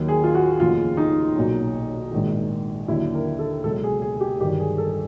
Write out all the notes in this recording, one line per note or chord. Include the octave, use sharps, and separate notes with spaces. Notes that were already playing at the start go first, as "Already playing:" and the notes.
Already playing: D#2 D#3 F#3
G#4
F4
F#4
F1 D#2 C#3 F3 F4
D#4
B1 A#2 F#3
A#1 G#2 D#3
D#2 D3 F#3 E4
A#4
A4
C#2 B2 F#3 A4
G#4
G#4
G4
G1 G2 D#3 F#3 G4
G#4
A4